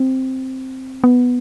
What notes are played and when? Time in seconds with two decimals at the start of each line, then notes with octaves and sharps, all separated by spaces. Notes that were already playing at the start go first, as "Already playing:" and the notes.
Already playing: C4
1.04 B3